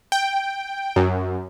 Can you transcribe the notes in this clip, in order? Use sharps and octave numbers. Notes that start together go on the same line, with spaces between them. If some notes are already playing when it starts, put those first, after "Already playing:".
G5
F#2